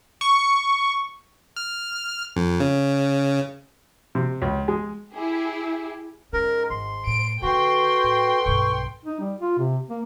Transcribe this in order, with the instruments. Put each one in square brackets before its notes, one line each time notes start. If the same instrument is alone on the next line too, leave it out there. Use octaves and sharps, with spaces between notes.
[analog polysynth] C#6
[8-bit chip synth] F6
F2
C#3
[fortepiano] C3
C#2
G#3
[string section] E4 G4 G#4
[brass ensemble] G#2 [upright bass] G#3 C#4 [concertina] A#4
[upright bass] G#1 [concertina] C6
[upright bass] A2 [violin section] D7
[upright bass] D3 A#3 [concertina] F#4 [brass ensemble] A4 B4 [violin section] G5 C6
[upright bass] A2
[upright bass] B1 G2 [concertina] C#6
[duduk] D#4
G3
F4
C3
A#3